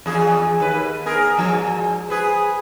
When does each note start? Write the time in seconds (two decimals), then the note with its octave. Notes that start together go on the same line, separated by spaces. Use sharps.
0.06 E2 G#4
0.60 D#2 B4
1.06 B3 G#4 A#4
1.37 G#2 F3
2.09 G#4 B4 C5